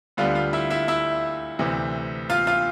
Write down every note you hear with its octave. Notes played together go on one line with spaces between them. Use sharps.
D2 D3 G3 B3 F4 F5
F4 F5
E4 E5
E4 E5
E4 E5
D2 C3 E3
F4 F5
F4 F5